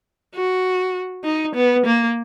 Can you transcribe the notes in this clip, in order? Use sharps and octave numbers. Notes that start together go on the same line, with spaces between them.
F#4
D#4
B3
A#3